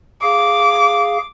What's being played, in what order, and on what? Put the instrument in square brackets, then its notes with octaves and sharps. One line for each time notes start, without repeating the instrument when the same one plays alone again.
[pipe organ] G#4 F5 [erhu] D6